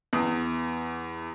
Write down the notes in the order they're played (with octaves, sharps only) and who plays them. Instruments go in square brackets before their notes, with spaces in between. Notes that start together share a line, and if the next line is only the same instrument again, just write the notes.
[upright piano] E2